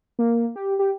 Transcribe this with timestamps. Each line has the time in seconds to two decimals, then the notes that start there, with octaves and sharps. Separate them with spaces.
0.19 A#3
0.56 G4
0.79 G4